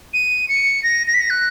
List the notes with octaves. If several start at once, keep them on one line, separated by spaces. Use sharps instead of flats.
D#7
C#7
A#6
A#6
B6
A#6
F#6